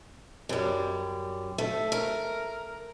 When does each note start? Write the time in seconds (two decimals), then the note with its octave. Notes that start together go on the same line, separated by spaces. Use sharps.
0.49 F#2 G3
1.58 A3
1.92 A#4